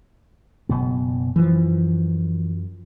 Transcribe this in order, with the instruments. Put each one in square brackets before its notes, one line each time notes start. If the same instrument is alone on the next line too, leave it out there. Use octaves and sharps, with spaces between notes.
[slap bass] F#1 B2 B3
[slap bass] F#2 [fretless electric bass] E3 F3